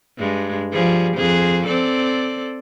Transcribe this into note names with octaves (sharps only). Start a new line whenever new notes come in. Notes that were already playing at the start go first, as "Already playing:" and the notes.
G2 G#3
F3 G3 G#4
F2 G#4 C5
C4 A4 D5